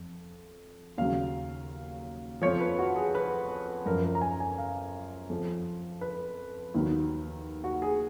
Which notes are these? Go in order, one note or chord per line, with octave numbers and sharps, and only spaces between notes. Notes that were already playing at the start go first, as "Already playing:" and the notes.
Already playing: F2
D#2 C#3 F#3 F5
F2 F3 C#5
B4
F#4
G#4
B4
F#2 F3 A#4
A#4
A#5
G#5
G#5
F5
F2 F3
B4
D#2 D#3 F#3
F#4
G#4